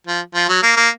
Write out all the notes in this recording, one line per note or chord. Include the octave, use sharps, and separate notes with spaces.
F3
F3
F#3
A#3
A#3